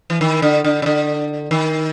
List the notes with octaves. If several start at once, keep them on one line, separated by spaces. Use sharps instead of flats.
E3
D#3
D3
D3
C#3
D3
D#3